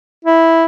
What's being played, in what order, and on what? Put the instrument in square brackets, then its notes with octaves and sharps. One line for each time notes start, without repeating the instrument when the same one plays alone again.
[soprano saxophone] E4